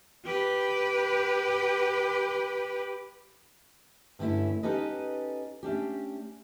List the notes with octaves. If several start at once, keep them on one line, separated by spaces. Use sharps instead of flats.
G4 B4
G2 D3 A3 C#4 E4
C#4 D#4 G4 A4 B4 D#5
A3 C#4 D4 G4